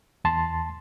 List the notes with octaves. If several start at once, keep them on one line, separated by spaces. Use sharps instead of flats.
E2 A5 C6